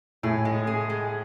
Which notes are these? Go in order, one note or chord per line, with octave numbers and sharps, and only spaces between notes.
A2 G#4
G#3
G#4
G#3